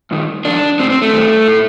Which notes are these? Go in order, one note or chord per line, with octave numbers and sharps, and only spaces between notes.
G2 D#3
F2 D#3 D4
A2 C4
C4
A3
G2 D#3
A2